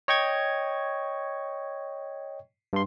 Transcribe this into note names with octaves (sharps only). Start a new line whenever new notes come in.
C#5 D#5 G5 C#6 G#6
G2 C6